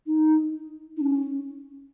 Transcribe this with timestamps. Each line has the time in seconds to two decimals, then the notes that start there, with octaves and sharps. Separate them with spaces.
0.06 D#4
0.97 D#4
1.00 C#4